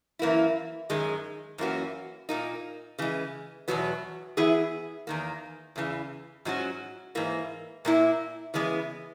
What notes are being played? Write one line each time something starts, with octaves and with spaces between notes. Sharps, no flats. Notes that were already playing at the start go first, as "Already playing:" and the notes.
F#2 E3 A#3 E4
F#2 D#3 G#3
F#2 E3 A#3 C#4 F#4
A#2 A#3 D#4
C#3 E3 G#3
E2 B2 F#3 B3
E3 B3 E4 G#4
E2 D#3 A#3
E2 C#3 E3
G#2 F#3 C#4 F#4
G#2 E3 A#3
A#2 A#3 E4
C#3 E3 G#3 B3